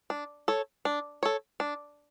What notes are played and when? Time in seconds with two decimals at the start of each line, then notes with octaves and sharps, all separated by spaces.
0.10 D4
0.48 A4 C#5
0.85 D4
1.23 A4 C#5
1.60 D4